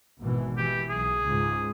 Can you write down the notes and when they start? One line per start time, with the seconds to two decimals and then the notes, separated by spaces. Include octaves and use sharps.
0.20 G#1 B2 E3
0.58 E3 G4
0.90 B1 G#4
1.24 C#2 G#2